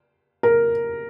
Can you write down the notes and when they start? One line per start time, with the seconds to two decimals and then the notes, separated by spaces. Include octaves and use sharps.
0.43 A#4